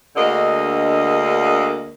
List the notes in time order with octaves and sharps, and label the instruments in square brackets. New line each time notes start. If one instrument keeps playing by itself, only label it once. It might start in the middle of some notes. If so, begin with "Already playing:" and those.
[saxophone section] D2 D3 G#3 A#3 D#5